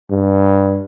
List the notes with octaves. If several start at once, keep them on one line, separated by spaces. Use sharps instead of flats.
G2